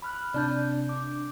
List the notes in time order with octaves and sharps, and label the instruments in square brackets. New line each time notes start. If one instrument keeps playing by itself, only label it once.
[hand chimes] B5 F6 F#6
[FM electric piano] C3 D4 [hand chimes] D5 A5 G6
[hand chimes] D6